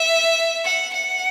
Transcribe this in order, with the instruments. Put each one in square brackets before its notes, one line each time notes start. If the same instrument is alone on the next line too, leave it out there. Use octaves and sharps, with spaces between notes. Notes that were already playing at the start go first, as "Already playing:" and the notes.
Already playing: [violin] E5
F#5
F#5